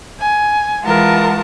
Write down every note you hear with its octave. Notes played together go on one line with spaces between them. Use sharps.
G#5
E3 G#3 F4 A#4 F#5 A5